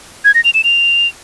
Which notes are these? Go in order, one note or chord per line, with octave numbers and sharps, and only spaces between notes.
G#6
A#6
F7
E7
F7